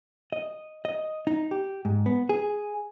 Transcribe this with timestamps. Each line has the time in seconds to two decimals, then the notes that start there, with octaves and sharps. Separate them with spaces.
0.32 D#5
0.85 D#5
1.27 D#4
1.51 G4
1.85 G#2
2.06 B3
2.29 G#4